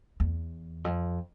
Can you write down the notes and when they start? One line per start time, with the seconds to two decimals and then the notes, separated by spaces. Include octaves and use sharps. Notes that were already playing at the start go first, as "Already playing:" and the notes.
0.20 E2
0.84 F2